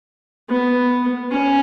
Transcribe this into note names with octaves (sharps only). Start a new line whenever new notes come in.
B3
C#4